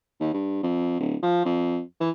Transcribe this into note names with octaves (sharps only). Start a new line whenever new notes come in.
D#2
G2
F2
D1
F3
F2
E3